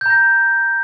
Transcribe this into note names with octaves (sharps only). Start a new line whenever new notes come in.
A#5 G6 A#6